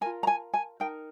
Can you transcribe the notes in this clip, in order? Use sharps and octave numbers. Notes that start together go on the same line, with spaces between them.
F4 A#4 G#5
A#5
G#5
G#5
D#4 A#4 G5